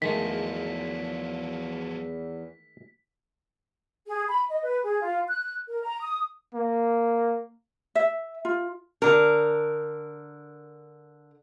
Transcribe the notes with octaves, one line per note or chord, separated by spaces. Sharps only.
E2 D#3 F3 F#3 G#3 A3 B6
G#4
B5
D#5
B4
G#4
F4
F#6
A#4
A#5
D#6
A#3
E5
F4
D3 A#4